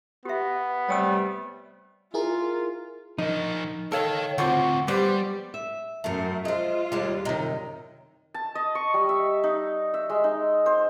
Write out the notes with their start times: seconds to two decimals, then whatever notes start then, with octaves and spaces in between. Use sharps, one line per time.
0.25 B3 G4 E5
0.89 C3 G3 A3 C#5 G5 E6
2.14 E4 F4 G#4 A#4
3.18 F3 D#4 A#4
3.92 A4 A#4 C#5 F5 G5
4.38 D2 C4 F4 F#4 C5 D6
4.88 G3 B3 G4 C5 D5
5.54 E5
6.04 F#2 A3 A#4
6.45 G#3 F4 C5
6.92 D#2 G3 G#3 D4 G4
7.25 F#2 C3 D#3 D#4
8.34 A5
8.55 D#5
8.75 C#6
8.94 G3
9.09 E5
9.44 D#4
9.94 E5
10.10 G#3
10.24 D#4
10.66 C5